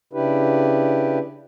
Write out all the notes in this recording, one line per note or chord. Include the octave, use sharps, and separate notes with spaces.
C#3 D4 E4 G4 B4